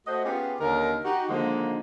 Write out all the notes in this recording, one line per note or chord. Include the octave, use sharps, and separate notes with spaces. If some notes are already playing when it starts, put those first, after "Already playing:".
A3 F#4 C5 D#5 F#5
B3 C#4 F4 G4 G#4
D#2 D3 C#4 D#4 A#4
D#4 F#4 G4
D3 D#3 F3 G#3 A#3 D#4